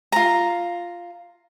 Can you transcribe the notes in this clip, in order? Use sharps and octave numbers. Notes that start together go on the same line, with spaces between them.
F4 A#5